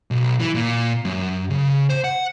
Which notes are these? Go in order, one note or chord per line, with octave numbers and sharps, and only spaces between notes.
B1
E3
A#2
F#2
C#3
C5
F#5